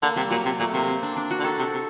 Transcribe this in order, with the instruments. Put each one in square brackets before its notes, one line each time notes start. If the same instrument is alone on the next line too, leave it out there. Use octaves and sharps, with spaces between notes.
[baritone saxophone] D3 [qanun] A#3
[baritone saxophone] C3 [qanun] G3
[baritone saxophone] A#2 [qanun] F#3
[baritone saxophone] C3
[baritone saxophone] A#2 [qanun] A3
[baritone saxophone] C3 [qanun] A#3
[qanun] C4
D4
D4
F#4
[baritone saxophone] D3
[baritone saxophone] D#3 [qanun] A4
[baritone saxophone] C3
C3